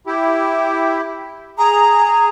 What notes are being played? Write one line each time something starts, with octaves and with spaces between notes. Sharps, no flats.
E4 G4
G#4 A#5